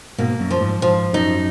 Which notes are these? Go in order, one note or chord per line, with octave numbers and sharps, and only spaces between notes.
G#2 B2 A#3
F#2
F3
G#2
G#2 F3
F#2 D#4